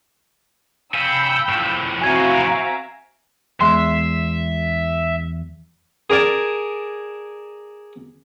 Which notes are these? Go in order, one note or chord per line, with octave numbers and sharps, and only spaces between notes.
F5 G5 G#5 B5 E6 G6
A2 F3
C4 F#4 E5 F5 G#5 A#5 G#6 D#7
D7
E2 G#3 E5 C6
G#4 A#4 D5 G#5 A5